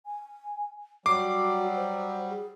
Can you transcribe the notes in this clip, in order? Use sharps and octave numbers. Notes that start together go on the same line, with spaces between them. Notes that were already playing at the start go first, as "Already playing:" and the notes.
G#5
F#3 G3 F#4 D6 C7
C5
G#4